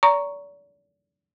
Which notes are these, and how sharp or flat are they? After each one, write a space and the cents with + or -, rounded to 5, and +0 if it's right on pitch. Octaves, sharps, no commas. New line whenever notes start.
D5 -40 A#5 +0 C#6 +0